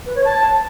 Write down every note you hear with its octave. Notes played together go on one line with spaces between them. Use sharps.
B4
C#5
A5